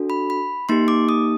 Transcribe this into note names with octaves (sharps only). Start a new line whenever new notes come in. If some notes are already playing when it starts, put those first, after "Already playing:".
Already playing: D4 F#4 A4
B5
B5
A#3 D#4 G4 C6
D6
D#6